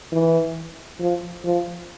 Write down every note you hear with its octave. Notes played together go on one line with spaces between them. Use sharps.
E3
F3
F3